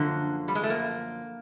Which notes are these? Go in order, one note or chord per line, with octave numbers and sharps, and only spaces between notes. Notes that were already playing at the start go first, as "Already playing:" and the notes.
Already playing: F#2 D3 F3 A#3
G3
G#3
A3
A#3